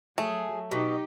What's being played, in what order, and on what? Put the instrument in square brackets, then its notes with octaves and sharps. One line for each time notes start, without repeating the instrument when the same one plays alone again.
[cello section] F#3 [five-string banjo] A3 [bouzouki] G#4
[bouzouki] B2 [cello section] D#4 G4